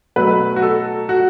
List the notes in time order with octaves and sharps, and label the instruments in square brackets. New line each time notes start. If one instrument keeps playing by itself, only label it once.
[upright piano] B2 F#3 A3 B4
F#4
A4
F#4